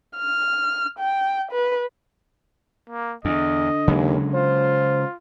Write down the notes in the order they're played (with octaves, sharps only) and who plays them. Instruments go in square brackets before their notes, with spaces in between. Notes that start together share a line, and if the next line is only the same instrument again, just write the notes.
[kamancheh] F6
G5
B4
[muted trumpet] A#3
[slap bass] E2 [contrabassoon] D3 [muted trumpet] D#5
[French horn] D#2 [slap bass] C#3 F#3 G#3
[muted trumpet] F4 [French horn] C5